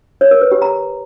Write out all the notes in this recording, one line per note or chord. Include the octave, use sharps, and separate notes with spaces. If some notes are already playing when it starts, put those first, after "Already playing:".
C#5
A#4
B4
G4
A#5